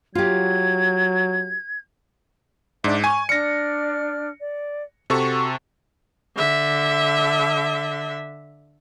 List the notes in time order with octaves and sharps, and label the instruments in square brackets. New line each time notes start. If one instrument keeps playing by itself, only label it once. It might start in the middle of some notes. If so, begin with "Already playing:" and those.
[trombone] F#3 [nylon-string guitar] F4 G4 [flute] G#6
[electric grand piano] G#2 [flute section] D4 D5 E5
[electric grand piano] G#5 [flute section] C#6
[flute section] D4 D5 F6 [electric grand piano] A#6 C#7
[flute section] D5
[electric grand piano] C3 A4 C#6 [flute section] F#4
[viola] D3 E5